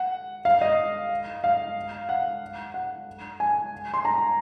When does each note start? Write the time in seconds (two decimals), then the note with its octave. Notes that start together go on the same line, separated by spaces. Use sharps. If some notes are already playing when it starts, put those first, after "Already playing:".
Already playing: F#5
0.45 F5
0.61 D#5
1.44 F5
2.09 F#5
2.74 F#5
3.40 G#5
3.94 C6
4.05 A#5